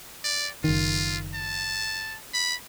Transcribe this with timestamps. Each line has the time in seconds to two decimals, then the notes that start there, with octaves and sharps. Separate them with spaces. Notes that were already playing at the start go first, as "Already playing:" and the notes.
0.24 D5
0.64 F#1 D#3 F4
1.34 A5
2.33 B5